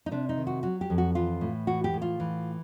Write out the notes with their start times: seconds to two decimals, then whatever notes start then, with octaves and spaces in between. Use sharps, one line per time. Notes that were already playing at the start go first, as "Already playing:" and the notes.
0.06 D#4
0.11 C3 D4
0.29 D#4
0.38 D#3
0.47 F#4
0.63 F#3 F#4
0.81 G4
0.90 F2
0.98 F#4
1.15 E3 F4
1.41 A2
1.67 E3 F#4
1.84 G4
1.93 A2
2.02 F4
2.20 E3